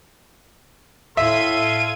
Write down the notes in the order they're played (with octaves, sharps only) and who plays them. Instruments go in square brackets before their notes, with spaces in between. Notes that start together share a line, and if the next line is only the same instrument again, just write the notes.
[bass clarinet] A2 [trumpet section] A4 F5 C6 [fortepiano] E5 [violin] G#6 D#7